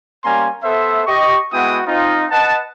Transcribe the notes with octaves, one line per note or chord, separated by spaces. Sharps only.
G3 A#3 C#4 G#5 A#5 C6
B3 A4 C5 E5
G4 D#5 C#6
G#3 B3 E4 F#4 G5 D#6
C4 D#4 F4
B4 D#5 F#5 A5